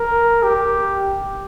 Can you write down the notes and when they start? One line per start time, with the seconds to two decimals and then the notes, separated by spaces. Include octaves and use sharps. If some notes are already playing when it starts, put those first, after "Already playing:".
Already playing: A#4
0.43 G4